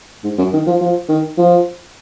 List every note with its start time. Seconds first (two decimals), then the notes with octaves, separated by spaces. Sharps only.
0.24 G#2
0.38 F#2
0.53 D#3
0.66 F3
0.81 F3
1.09 D#3
1.38 F3